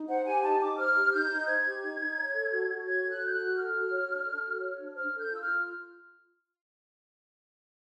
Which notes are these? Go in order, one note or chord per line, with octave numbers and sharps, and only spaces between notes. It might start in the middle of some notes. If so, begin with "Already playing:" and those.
Already playing: D#4
C5 F#5
G4 G#5
D#4 A5
D#4 D6
C5 F6
G4
D#4 G6
D#4
C5 G#6
G4
D#4
D#4
C#5
A4
F#4
F#4
C#5 G#6
A4
F#6
F#4 G6
F#6
F#4
A4 F6
F#4
C#5
D4
A4
F#4
C#5
D4
C5 F6
A4
G6
F4
E6
F6
F4